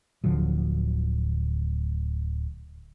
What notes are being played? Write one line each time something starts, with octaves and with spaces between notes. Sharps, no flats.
D1 D3 F3 F#3